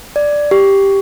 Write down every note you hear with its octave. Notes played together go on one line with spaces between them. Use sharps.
D5
G4